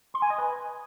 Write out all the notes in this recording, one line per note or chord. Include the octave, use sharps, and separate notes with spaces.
C6
G#5
D#5
B4